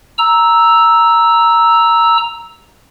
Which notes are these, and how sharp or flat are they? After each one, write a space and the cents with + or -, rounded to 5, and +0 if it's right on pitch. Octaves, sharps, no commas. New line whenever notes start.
A#5 +0 E6 -5